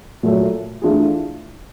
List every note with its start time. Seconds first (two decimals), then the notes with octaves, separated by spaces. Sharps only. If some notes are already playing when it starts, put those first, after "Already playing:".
0.23 A#2 F#3 A3
0.82 E3 A3 D4 F4 G#4